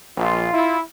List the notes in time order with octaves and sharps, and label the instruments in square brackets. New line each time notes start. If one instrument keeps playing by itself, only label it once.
[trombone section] A#1 [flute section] F4 F5
[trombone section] E4